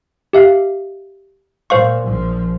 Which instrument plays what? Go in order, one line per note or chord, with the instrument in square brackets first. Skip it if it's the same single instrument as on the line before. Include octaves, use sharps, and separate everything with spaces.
[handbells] G4 E5 F5
[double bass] A#2 [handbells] C5 F5 C#6
[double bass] A#1 F3